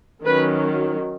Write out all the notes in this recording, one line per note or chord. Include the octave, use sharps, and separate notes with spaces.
D#3 F#3 C#4 B4